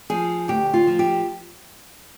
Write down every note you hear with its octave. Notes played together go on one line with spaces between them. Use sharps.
F3 G#4
D2 G4
F4
F3
G4